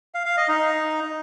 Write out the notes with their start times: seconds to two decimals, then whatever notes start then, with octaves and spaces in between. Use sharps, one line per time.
0.14 F5
0.26 F5
0.37 D#5
0.48 D#4